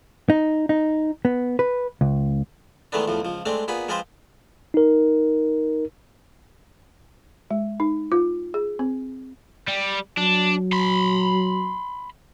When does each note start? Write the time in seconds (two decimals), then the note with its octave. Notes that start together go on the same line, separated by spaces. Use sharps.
0.30 D#4
0.69 D#4
1.25 B3
1.59 B4
2.01 C#2
2.92 D#3 E3 G#3 A3 B3 D4
3.08 E2 A2 F3
3.20 C#2 F3
3.46 G#3 A3 C4 D4
3.68 A#2 B3 G#4 B5
3.88 F3 G#3 C4 F4 B4 C5
4.74 D#4 A#4
7.51 G#3
7.80 D#4
8.12 F4
8.54 G#4
8.79 C4
9.68 G3
10.17 F#3 D4
10.73 B5 C6